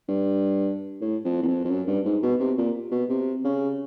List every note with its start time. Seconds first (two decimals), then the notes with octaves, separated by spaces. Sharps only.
0.08 G2
1.01 A2
1.25 F2
1.42 E2
1.47 F2
1.65 F2
1.70 F#2
1.87 G2
2.05 G#2
2.23 B2
2.40 C3
2.58 A#2
2.91 B2
3.09 C3
3.44 C#3